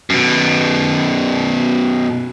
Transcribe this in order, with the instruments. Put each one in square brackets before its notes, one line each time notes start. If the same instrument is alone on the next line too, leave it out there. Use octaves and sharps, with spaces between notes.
[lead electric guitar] F#2 B2